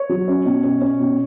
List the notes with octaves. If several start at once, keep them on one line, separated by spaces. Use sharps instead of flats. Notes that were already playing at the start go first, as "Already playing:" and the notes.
Already playing: C#5
F#3
C#4
B2
C#4
C#4
B2